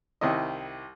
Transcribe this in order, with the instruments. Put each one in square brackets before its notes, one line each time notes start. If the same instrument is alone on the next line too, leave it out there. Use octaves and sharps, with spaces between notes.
[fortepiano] C2 D#3 E4 D#5